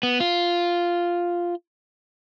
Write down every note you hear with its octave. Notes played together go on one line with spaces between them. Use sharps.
B3
F4